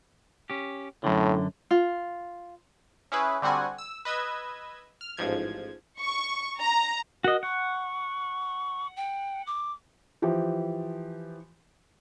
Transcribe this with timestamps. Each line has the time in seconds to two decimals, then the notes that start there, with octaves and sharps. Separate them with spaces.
0.50 C#4 G4
1.04 F#2 A2 D3
1.71 F4
3.12 C#4 E4 G#4 B4
3.42 D3 G3 C4 F#4 F#5 G#5
3.78 E6
4.05 B4 D#5 E6 G#6
5.01 F6
5.17 A1 G#2 F3 G#6
6.00 C#6
6.59 A#5
7.24 F#4 A#4 D#5
7.43 F#5 C#6
8.97 G5
9.47 D6
10.22 E3 F3 G4